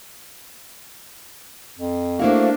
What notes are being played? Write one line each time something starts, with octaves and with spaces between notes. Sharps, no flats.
F2
A3 A#3 D4 E4 F#4 C5 F5